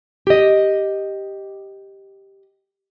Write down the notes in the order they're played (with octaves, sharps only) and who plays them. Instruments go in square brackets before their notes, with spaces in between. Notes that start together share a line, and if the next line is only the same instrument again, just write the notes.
[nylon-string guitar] G4 D#5